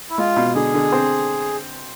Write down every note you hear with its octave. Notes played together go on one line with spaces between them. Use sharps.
E4
G#3 F4
B2
D3 G#4
D3
C4